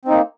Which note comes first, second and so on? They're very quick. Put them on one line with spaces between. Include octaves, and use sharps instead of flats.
C4 D#4 A#3